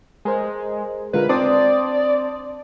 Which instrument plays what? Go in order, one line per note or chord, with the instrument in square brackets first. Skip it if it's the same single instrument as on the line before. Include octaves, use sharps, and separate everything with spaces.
[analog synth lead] G#3 [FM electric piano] G#4 A#4 C5
[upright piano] D3 A#4 [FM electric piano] G#3 F4 [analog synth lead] B4
[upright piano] C4 D4 [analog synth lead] D5 [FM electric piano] A5 C6 D#6